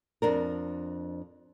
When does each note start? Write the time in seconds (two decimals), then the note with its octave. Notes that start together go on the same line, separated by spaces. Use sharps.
0.22 F2 D4 A#4